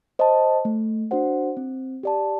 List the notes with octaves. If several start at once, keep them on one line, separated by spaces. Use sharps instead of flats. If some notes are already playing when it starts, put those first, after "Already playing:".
C5 D#5 A5
A3
D4 F#4 C5 F#5
C4
G4 D5 A5